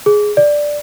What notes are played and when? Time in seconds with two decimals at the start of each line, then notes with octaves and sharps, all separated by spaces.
0.06 G#4
0.37 D5